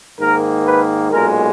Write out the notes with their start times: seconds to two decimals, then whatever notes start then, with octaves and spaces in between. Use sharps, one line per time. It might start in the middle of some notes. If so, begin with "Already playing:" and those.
0.19 G#2 D#3 A#3 A#4
0.65 B4
1.12 B1 A#2 G#3 A#4